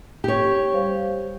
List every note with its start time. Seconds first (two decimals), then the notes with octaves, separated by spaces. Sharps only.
0.24 G4 C#5
0.73 G3 C5 F5